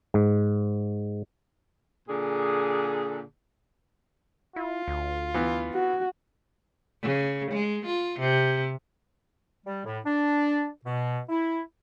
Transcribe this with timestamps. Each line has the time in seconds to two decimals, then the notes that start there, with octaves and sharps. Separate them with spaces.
0.14 G#2
2.08 A#2 D3 G#4
4.56 E4 F4
4.88 D2
5.34 E3 B3
5.74 F#4
7.03 C#3
7.51 G#3
7.86 F4
8.20 C3
9.66 G3
9.85 A2
10.04 D4
10.84 B2
11.29 E4